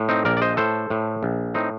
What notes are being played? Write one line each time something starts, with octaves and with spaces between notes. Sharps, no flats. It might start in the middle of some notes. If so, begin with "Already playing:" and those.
Already playing: A2
C4 D#4
A#1 A#4 D5
D5
C5 D#5
A2 A4 C5
A2
A#1
A2 C4 D#4